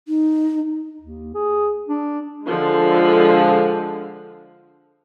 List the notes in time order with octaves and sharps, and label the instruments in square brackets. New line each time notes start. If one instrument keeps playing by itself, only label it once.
[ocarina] D#4
[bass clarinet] D#2
G#4
D4
[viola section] D3 F3 G#3